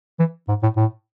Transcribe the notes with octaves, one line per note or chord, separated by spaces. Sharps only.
E3
G#2
A2
A2